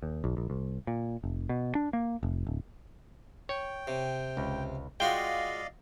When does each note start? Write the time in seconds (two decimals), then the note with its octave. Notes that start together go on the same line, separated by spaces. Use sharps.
0.02 D#2
0.24 B1
0.37 A#1
0.50 C2
0.87 A#2
1.24 F1
1.49 B2
1.75 D4
1.93 A#3
2.23 F1
2.47 D1
3.49 C#5 G5
3.87 C3
4.37 C#2
5.00 G#3 F4 F#4 D5 D#5 F5 G5